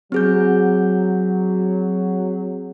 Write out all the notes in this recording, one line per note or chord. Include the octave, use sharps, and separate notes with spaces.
F#3 C4 G#4 G6